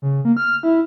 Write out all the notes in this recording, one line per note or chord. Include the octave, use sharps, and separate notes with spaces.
C#3
A#3
F6
E4